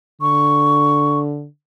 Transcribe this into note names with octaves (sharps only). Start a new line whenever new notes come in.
D3 C#6